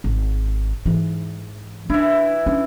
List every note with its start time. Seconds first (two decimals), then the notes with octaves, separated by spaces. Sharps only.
0.04 G#1
0.85 G#2 E3
1.90 E3 D4 E4
2.46 C#4 D4